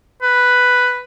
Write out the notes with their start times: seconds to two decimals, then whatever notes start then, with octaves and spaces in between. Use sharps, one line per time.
0.22 B4